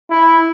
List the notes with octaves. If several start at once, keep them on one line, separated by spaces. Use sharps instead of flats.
E4